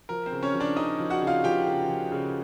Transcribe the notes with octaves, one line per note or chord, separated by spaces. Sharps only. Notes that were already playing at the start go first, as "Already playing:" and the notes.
F3 A#4
C4 C5
C#3
C#4 C#5
F3
D4 D5
C#3 D#4 D#5
F3
F#4 F#5
C#3
F4 F5
F3 G4 G5
C#3
F3
C#3